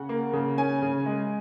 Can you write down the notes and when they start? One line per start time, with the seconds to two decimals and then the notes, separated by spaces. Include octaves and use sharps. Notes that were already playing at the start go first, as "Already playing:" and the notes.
Already playing: C#3 F#5
0.09 A#3
0.33 C#3
0.58 C#4 G#5
0.82 C#3
1.06 G#3